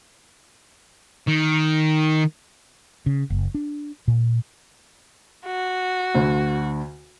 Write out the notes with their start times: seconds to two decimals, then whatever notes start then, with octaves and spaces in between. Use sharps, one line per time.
1.27 D#3
3.06 C#3
3.30 F#1
3.55 D4
4.08 A#2
5.46 F#4
6.15 D2 D3